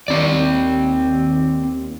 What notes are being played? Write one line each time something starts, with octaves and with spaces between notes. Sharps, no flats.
D#2 C4 D5